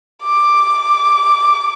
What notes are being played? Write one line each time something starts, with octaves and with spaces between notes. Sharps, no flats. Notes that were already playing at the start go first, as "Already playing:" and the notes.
D6